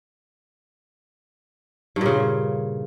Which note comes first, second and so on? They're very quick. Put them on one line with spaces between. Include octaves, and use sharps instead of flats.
G2 A#2 C#3